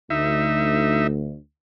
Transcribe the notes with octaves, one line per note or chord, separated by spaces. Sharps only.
D2 D#4 E5